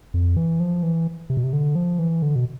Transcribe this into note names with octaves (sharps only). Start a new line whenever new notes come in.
F2
E3
F3
E3
C3
B2
C3
D3
F3
E3
D3
B2